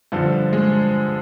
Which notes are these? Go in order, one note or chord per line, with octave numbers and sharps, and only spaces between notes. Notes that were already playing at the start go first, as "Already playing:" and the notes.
G2 D3 F3
G#3